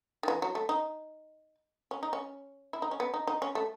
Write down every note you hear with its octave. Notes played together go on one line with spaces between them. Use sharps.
D#3
E3
F#3
A3
D#4
C#4
D#4
C#4
E4
D#4
C#4
B3
D#4
D#4
C#4
A3